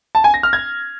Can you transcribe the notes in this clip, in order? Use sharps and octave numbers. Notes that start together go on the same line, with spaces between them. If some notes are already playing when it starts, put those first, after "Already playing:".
A5
G#5
A#6
F6
G#6